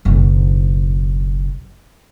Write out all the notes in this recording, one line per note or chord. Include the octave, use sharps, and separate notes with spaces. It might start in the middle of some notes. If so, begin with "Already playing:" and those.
F#1 B1